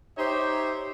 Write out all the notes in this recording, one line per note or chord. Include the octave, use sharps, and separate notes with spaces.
D#4 G4 C5 C#5 E5